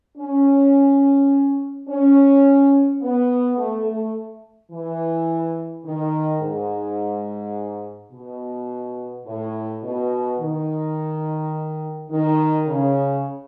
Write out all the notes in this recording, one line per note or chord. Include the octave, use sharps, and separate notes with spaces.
C#4
C#4
B3
A3
A3
E3
D#3
G#2
B2
A2
B2
D#3
D#3
C#3